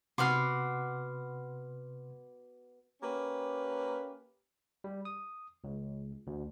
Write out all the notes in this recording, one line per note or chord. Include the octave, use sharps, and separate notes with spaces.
C3 B3 F#4 B4 C6 D6 F6 C7
A#3 C#4 G4 B4
G3
D#6
C#2
D2